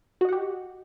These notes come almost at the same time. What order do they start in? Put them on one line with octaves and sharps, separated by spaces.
F#4 D#5 F#5 G4